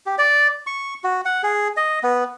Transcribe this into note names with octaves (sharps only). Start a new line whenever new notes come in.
G4
D5
C#6
F#4
F#5
G#4
D#5
B3